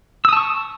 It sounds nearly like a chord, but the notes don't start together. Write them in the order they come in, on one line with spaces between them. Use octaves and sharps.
E6 D#6 A5 C#6